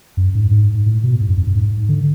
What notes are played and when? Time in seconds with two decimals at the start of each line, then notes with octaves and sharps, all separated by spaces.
0.17 F#2
0.35 G#2
0.51 G#2
0.86 A2
1.04 B2
1.21 G#2
1.29 F#2
1.37 F2
1.47 F#2
1.55 G#2
1.89 D3